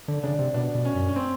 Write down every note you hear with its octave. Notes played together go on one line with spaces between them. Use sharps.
D3
C#3 D4
C3
B2 D4
B2
C#4
F#2
C#4
C4